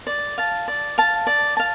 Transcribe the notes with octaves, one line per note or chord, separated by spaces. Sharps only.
D5
F5 A5
D5
F5 A5
D5
F5 A5